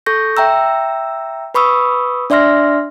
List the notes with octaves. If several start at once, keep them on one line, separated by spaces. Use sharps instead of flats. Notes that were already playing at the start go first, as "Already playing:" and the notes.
A4 C#6 G6 A#6
E5 G5 A#5 E6
B4 B5 C#6 D#6 E6
D4 D5 E5 C6 F6 A#6